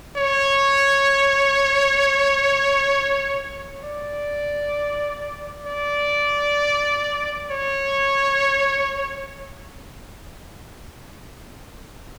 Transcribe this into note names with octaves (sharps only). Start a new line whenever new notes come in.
C#5
D5
D5
C#5